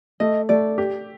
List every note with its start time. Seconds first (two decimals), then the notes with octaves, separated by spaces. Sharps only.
0.20 A3 D#5
0.49 A3 D5
0.78 G4